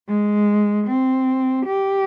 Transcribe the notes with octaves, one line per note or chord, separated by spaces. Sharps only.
G#3
C4
G4